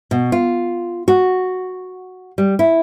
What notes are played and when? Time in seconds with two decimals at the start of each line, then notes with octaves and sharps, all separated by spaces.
0.11 B2
0.32 F4
1.08 F#4
2.38 G3
2.59 E4